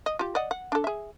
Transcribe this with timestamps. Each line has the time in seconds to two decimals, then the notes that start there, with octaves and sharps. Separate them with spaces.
0.06 D#5
0.19 F4 G4
0.35 D5 D#5 F#5
0.51 F#5
0.72 D4 A4
0.84 G#4 E5